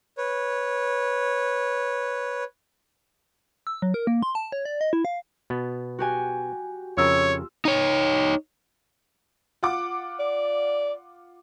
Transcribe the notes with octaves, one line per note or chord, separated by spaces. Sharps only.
B4 C#5
E6
F#3
A#4
A#3
C6
A5
C#5
D5
D#5
E4
F5
B2 B3
F#4 G4 G#5
F2 C#3 F4 A#4 C#5 E6
D#4 C#5
F4 F#5 D6
D5